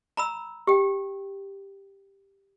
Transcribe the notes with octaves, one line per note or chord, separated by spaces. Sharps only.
A#5 B5 E6
G4 G5